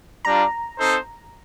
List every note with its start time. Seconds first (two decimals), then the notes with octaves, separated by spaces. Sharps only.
0.24 G3 D4 F4 A#5
0.78 C4 D#4 A4 C5